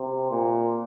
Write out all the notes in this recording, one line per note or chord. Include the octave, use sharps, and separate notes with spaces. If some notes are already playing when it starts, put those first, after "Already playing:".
Already playing: C3
A#2